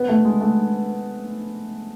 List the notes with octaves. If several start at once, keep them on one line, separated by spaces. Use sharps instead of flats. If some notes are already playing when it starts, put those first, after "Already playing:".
Already playing: B3
A3
G#3
A3